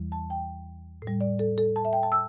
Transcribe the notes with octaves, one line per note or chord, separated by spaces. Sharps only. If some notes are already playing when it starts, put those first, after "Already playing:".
Already playing: E2 E3 G3
A5
G5
A2
G3
D5
A4
A4
A5
E5
G5
A5
E6